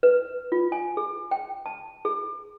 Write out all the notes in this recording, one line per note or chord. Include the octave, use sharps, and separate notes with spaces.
B4
F4
G#5
G#4
G5
A5
G#4